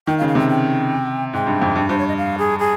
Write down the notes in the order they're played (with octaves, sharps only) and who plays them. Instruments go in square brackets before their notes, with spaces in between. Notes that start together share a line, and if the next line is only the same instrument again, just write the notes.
[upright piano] D#3 [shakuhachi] G5
[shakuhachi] F5
[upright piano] C#3
[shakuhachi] F5
[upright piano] C3 [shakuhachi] G5
[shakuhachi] G5
[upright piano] G#2 [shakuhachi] G5
[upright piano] G2
F2
G2
[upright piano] G2 [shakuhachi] C5
[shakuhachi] C#5
D#5
F5
G#4
G#4